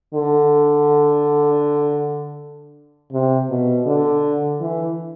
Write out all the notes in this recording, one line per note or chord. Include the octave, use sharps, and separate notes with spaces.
D3
C3
B2
D3
E3